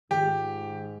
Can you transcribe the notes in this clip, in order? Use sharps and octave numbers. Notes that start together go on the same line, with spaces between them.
G#2 D#3 F4 G4